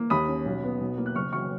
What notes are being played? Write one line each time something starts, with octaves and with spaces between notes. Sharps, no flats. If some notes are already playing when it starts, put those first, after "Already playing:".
Already playing: A#3
D#2 B5 D#6
C#4
B1
B3
B1
A#3
F#6
F#1 C#6 F6
F#3 C#6 F6